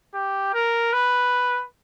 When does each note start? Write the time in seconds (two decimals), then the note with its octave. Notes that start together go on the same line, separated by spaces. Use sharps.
0.14 G4
0.54 A#4
0.93 B4